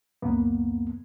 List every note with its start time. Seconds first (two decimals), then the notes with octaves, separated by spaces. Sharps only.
0.22 C#2 F#2 A#3 B3